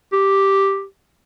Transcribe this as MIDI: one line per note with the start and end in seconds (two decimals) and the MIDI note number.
0.13 0.85 67